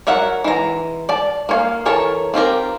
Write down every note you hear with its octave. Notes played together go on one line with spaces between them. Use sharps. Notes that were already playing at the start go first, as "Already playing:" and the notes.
F#3 A#4 E5 F#5
E3 G#3 A#5
D5 A5
A#3 C#5 F5
E3 A4 A#4 C#5 A5
C4 F4 G4 A#4